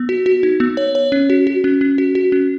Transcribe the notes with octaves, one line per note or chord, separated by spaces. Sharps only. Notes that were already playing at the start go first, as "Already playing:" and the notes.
Already playing: B3
F#4
F#4
D#4
B3
C#5
C#5
C#4
F#4
F#4
C#4
C#4
F#4
F#4
C#4